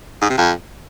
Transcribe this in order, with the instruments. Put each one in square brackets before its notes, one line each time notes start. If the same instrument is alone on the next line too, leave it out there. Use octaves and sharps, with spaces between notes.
[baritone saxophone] G#2
C3
F2